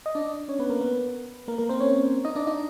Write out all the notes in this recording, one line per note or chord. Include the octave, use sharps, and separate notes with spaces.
D#5
D4 D5
C#4 C#5
B3 B4
A#3 A#4
B3 B4
A#3 A#4
A#3 A#4
C4 C5
C#4 C#5
D#4 D#5
D4 D5
D#4 D#5